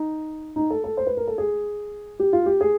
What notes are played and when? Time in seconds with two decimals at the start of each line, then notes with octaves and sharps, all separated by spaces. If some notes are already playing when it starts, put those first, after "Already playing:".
Already playing: D#4
0.56 D#4
0.70 A4
0.84 A4
0.97 C5
1.07 B4
1.17 A#4
1.28 A4
1.38 G#4
2.20 G4
2.33 F4
2.46 G4
2.61 G#4